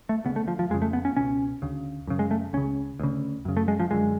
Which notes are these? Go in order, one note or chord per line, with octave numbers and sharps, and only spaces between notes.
A3
D2 C#3 B3
A3
F3
F3
F2 C#3 G#3
A3
B3
C#4
C#2 B2 C#4
D2 C#3
F#2 C#3
G#3
A3
C#2 C#3 C#4
D2 C#3
F#2 C#3
A3
G#3
F3
F#2 D3 G#3